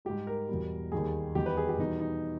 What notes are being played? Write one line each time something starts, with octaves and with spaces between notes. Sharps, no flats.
G#2 G3 G4
A#4
E2 B2 G3
D#2 D#3 G3 G#4
E2 D#3 G3 G4
B4
G#4
G4
E2 B2 G3 D#4
D#4